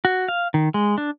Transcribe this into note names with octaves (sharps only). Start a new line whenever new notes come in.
F#4
F5
D#3
G#3
D4